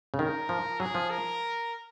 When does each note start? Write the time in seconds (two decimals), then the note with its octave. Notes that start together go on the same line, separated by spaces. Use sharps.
0.14 C#3
0.19 D#3 A#4
0.49 F3
0.80 F#3 G#4
0.95 F3
1.10 A#4